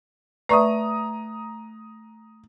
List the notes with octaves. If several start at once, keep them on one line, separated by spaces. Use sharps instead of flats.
A3 B4 D5 E5 A#5 C#6 D#6